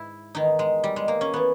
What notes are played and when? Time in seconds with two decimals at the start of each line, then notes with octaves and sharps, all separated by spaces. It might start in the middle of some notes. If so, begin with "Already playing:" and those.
Already playing: G#2 E4
0.35 E2 D#3 D#4
0.59 G#3
0.84 G3
0.96 G#3
1.08 A#3
1.21 C#4
1.34 E3 B3